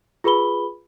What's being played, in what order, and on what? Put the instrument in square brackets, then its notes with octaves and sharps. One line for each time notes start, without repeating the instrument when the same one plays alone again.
[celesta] F4 G#4 B4 B5 G7